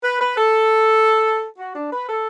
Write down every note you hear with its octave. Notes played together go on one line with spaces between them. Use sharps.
B4
B4
A4
F#4
D4
B4
A4